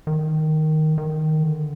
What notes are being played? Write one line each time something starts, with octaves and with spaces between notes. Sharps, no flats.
D#3
D#3
D3